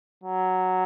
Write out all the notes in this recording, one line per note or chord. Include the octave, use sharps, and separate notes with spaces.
F#3